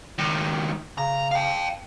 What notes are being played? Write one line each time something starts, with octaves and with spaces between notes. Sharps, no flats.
C#2 D#3
C#3 A#5
F5 G5